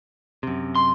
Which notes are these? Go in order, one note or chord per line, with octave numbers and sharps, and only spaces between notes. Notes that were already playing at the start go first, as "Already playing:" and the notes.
F#2 C3
C6